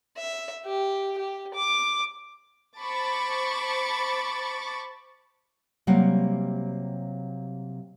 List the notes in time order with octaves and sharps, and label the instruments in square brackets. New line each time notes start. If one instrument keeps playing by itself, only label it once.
[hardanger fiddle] E5
G4
G4
D6
[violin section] C5 A5 B5 C#6 D6 A6
[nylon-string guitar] C3 F#3 G3 A#3 F5 F#5